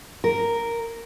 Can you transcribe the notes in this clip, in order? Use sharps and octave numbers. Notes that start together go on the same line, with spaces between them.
A#4